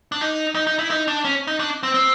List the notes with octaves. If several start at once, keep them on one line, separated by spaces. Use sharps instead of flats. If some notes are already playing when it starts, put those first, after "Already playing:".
D4
D#4
D#4
D#4
E4
D#4
D4
C#4
D#4
D4
C4
C4